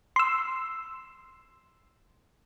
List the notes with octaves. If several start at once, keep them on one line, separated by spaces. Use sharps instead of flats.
C6 E6